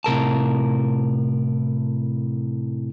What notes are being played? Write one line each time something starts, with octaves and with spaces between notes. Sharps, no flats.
A2 C3 A#4 A5